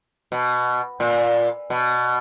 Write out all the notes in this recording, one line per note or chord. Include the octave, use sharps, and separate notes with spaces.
B2
A#2
B2